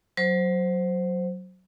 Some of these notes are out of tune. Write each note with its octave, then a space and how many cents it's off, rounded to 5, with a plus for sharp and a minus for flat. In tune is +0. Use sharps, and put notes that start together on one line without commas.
F#3 +0 C5 +0